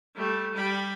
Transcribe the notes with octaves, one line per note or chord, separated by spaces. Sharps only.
G3 A3
G3 B5